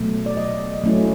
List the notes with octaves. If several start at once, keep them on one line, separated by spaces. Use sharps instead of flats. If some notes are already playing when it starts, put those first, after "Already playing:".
Already playing: B2 F#3 A3
D5
D#5
F#3 A3 C#4 E4